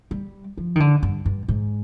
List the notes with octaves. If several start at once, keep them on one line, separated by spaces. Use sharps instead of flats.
G3
F3
D#3
D3
G2
G2
G#2